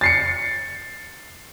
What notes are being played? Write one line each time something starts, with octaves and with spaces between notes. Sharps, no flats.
A6 C7 C#7